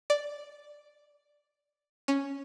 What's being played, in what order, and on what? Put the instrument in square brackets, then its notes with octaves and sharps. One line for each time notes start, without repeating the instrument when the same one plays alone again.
[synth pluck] D5
C#4